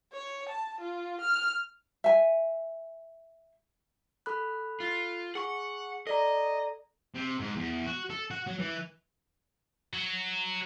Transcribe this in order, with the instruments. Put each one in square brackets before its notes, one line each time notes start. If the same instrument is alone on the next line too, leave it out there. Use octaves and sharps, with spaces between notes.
[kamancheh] C#5
A5
F4
F6
[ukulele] E5 G#5
[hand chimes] A4 B5 F#6
[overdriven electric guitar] F4
[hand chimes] G#4 C#6 [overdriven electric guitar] F#5
[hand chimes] A4 D5 A#5 [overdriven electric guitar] D#5
[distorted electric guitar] C3
G#2
E2
F#4
A4
F#4
F#3
E3
F#3